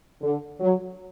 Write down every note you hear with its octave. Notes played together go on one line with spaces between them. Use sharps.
D3
F#3